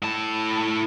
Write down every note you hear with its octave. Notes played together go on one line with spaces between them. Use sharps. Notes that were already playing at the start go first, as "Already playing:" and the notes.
A2 A5